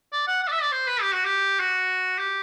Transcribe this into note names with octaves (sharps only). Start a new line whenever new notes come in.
D5
F#5
F#5
D5
E5
D5
C5
B4
G4
F#4
G4
F#4
G4